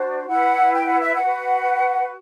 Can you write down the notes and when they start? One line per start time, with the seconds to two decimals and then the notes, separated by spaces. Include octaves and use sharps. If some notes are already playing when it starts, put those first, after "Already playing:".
Already playing: D4 F#4 C5
0.27 E4 B4 F#5
0.74 G5
0.87 F#5
1.00 E5
1.15 F#5
1.22 F#4 B4